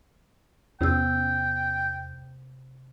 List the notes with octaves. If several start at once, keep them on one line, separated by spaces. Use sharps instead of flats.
E2 C3 B3 C#4 F4 G5 E6